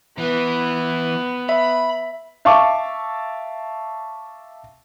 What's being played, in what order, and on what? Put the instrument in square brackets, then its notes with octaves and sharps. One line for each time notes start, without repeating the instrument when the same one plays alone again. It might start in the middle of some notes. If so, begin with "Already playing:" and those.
[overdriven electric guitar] E3 [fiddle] B3
[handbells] E5 [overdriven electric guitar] B5
[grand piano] E5 F5 A5 C#6 D6